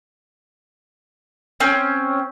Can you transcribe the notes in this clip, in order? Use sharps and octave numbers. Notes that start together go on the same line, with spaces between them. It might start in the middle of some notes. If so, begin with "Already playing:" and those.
C4 C#4